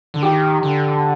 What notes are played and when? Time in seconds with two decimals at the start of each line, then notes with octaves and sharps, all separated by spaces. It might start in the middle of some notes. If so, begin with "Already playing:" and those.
0.14 D3
0.23 D#3 G4
0.63 D3